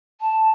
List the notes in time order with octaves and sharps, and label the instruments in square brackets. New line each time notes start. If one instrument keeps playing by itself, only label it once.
[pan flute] A5